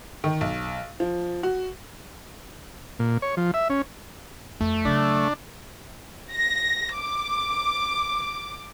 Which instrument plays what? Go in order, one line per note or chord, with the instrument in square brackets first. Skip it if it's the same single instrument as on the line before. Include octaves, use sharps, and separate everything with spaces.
[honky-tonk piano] D#3
B1
F3
F#4
[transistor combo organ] A#2
C#5
F3
E5
C#4
[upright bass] F2 [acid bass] A3
[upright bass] C#3 F#3 [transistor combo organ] D4
[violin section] A#6
D6